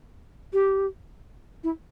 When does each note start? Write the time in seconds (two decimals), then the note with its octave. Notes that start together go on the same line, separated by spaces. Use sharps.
0.53 G4
1.64 E4